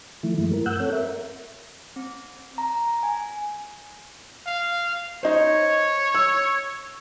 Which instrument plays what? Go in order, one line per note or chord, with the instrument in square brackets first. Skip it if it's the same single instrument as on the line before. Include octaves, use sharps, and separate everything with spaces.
[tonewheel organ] D#3 F3 A3 E4
G2 F3 G#3 A3 E4
A#4
G2 F#5 E6 F#6 G6
C4 A4 C#5
A#4 E5
[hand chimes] C4
A#5
G#5
[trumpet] F5
[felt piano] D#4 C5 [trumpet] C#5
[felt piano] E6